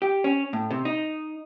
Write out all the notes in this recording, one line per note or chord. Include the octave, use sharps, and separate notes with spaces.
G4
C#4
A2
C3
D#4